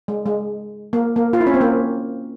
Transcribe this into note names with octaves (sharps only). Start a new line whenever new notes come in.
G#3
G#3
A#3
A#3
F4
E4
C#4
C4
A#3